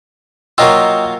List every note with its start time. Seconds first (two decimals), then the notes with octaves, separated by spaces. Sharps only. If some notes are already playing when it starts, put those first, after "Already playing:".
0.58 F#3 A#3 F4 D#5 G5 E6